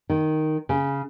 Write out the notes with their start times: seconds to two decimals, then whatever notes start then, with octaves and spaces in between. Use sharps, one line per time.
0.10 D#3
0.69 C#3